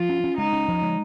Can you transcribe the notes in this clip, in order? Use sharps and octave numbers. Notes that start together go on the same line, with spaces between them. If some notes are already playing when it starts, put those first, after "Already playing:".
Already playing: F3 F4
C#4
C#4
G#3 D#4
C#4
F3
G#3